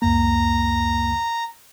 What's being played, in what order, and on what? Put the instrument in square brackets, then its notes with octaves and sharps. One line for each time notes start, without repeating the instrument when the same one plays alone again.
[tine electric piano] C#2 F#2 A#3 [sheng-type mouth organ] A#5